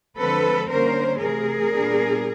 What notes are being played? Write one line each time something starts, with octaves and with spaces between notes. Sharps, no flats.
D3 F3 G#3 C4 A4 B4
D3 G3 A#3 C#4 A#4 C5
C3 E3 A3 G#4 A#4
A#2 G3 B3 D4